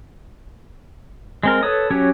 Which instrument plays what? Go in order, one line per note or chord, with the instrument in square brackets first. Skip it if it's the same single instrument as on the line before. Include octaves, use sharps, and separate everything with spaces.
[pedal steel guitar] G#3 C4 A#4
A4 B4 C#5 D#6
F#3 C#4 G4 C#5